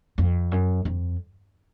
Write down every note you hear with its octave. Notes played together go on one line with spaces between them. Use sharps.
F2
F#2
F2